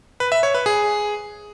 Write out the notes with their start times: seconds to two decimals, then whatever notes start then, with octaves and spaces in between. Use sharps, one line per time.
0.20 B4
0.32 E5
0.43 C#5
0.55 B4
0.66 G#4